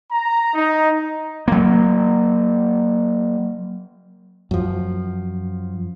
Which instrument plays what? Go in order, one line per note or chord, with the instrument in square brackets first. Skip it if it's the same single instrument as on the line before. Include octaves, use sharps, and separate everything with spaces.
[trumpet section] A#5
D#4
[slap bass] F#3 A#3
[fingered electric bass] F#2 F3